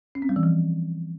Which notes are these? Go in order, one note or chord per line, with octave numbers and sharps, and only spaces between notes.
C#4
C4
G3
E3
F3